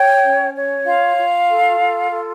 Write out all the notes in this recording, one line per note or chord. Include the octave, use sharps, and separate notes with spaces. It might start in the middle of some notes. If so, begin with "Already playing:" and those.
Already playing: C#5 G5
C#4
C#5
F4 F5
F4
A4
F4
A4